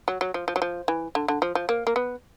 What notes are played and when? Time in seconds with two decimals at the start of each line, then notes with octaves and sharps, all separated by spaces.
0.08 F#3
0.21 F#3
0.34 F3
0.48 F3
0.56 F#3
0.62 F3
0.88 E3
1.15 D3
1.28 D3
1.42 F3
1.55 F3
1.69 A#3
1.87 A#3
1.96 B3